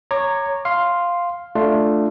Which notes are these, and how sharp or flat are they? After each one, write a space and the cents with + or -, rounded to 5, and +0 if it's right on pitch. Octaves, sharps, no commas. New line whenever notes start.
C#5 +0 A#5 -10 D6 +25
F5 +0 C6 +0
A3 +0 D4 +0 F4 +0